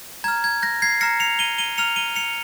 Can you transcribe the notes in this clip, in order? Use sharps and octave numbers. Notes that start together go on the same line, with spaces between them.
A#5 F6 G#6
G#6
G6 A#6
G#6 C7
A#5 F6 A#6 C#7
C#7 F7
D#7 G7
D#7 G7
A#5 F6 C#7 F7
D#7 G7
C#7 F7